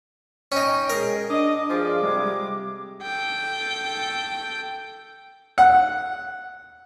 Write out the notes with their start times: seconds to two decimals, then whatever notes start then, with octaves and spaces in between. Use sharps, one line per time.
0.52 C#4 D#4 G5
0.90 G#3 G#4 A#4
1.29 D4 D#5 D6
1.69 G2 F3 F4 G#4 D6
2.02 C3 G3 G#3
3.03 A4 G5
5.58 F#5